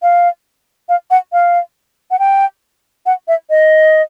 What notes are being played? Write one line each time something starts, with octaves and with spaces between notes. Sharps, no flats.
F5
F5
F#5
F5
F#5
G5
F#5
E5
D#5